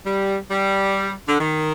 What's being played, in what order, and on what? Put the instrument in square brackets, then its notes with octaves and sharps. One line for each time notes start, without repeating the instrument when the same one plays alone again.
[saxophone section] G3
G3
D3
D#3